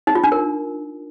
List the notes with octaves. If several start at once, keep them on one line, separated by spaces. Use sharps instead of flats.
D#4
F4
D4
A#4